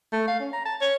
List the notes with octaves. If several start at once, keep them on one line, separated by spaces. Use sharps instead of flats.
A3
F5
C#4
A#5
A5
C#5